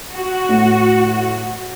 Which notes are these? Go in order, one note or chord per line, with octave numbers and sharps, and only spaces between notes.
F#4
A2